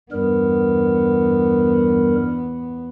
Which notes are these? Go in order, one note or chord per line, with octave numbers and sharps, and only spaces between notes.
E2 G2 G3 B3 A#4